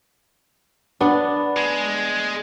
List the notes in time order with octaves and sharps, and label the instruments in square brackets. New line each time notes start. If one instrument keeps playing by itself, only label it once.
[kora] B3 D4
[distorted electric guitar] G#3